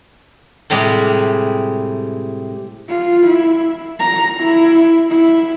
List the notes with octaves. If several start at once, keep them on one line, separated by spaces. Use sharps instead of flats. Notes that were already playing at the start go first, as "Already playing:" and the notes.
A2 C3 G3 G#3
F4
E4
A#5
E4
E4